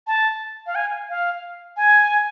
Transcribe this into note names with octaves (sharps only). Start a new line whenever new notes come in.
A5
F5
G#5
F5
G#5